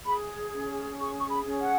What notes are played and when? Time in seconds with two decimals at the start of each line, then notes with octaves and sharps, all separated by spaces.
0.06 G#4 B5
0.53 C#4
0.99 G#4 C#6
1.20 C#6
1.30 B5
1.45 C#4
1.61 F#5